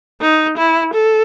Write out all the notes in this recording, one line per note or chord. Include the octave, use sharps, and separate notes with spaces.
D#4
E4
A4